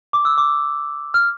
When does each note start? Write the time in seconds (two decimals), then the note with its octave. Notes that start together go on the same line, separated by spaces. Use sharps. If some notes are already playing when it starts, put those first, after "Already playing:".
0.13 D6
0.25 E6
0.38 D6
1.14 F6